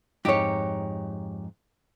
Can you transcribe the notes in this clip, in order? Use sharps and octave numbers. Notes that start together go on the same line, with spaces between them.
F2 G#2 D#4 G4 C#5